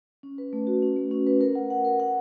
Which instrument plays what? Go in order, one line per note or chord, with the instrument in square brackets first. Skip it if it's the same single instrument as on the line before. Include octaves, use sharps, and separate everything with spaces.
[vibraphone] C#4
B4
A3
F#4
C#4
A3
C#4
B4
A#4
F#5
F#5
A#4
F#5